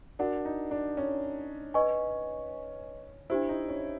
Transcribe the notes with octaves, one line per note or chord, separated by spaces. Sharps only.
D4 F#4 A#4 D5 F#5
D#4
D4
C#4
B4 D#5 G#5 C#6
D4 E4 G4 C5
D#4
C#4